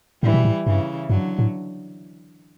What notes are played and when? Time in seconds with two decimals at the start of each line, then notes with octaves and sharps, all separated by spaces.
0.22 A2 E3 G3
0.34 B2
0.45 A2
0.66 G2 C#3 E3
1.10 G2 D3 F#3
1.39 A2